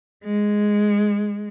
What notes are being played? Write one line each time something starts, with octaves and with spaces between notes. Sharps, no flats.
G#3